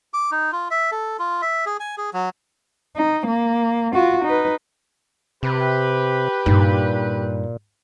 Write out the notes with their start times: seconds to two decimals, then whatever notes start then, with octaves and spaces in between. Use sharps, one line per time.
0.14 D6
0.31 D#4
0.52 F4
0.71 E5
0.92 A4
1.19 F4
1.42 E5
1.66 G#4
1.80 G#5
1.97 G#4
2.14 F#3
2.96 D#4
3.27 A#3
3.94 F4 F#4
4.25 D#4 B4
5.43 C3 G4 B4
6.46 G2 A#2 D#4